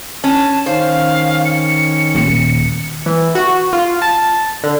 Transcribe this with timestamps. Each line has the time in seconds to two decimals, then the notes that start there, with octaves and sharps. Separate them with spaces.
0.24 C#4 A5
0.66 D#3 C#4 C5 F5
1.45 C#7
2.15 D#1 D#2
3.06 E3
3.35 F#4
3.73 F4
4.02 A5
4.63 D3